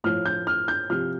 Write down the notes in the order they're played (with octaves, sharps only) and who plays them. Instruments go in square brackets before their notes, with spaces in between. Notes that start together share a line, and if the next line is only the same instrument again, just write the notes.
[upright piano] A2 F3 F6
G6
F6
G6
C3 F3 F6